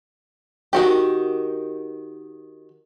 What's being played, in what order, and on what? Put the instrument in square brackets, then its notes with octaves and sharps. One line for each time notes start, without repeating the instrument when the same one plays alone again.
[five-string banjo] D#3 F#4 G4